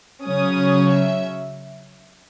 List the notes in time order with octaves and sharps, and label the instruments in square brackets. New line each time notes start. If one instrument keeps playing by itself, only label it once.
[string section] C#3 F#3 C#4 D#6
E5